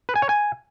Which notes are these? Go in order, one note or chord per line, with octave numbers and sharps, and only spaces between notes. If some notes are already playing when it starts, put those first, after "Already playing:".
B4
G#5
C#5
G#5